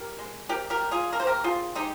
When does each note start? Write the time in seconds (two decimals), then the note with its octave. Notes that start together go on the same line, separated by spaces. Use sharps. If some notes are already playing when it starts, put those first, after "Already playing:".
Already playing: G4 A#4
0.19 G#3
0.49 C3 G4 A#4
0.70 G4 A#4
0.81 G3
0.91 F4 G#4
1.12 A#3 A#4
1.20 C5
1.27 G4 A#4
1.44 C3 F4 G#4
1.75 G#3 D#4 G4